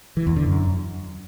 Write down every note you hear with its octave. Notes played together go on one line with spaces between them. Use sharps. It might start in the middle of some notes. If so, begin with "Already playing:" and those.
E3
E2
D3
F#2